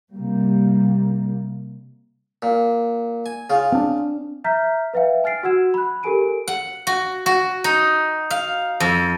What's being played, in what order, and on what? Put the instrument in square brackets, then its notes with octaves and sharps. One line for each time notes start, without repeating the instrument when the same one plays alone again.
[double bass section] C3 G3 A#3
[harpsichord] A#2
G#5
C#3 F4
[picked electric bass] C4 D4
[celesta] E5 A#5 F6 G6 B6
B4 E5 F5 G5
G#5 F6 A6 C7 D7
F#4 F#5 E6 G#6 E7
B5 F#6
G4 A4 A#4 G#5 D7 D#7
[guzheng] F#5
F#4
F#4
D#4
F5
F2